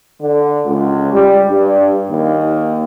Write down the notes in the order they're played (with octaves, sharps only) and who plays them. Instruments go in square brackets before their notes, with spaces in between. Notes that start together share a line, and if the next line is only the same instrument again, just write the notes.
[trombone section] D3
C#2
G3
G2
D#2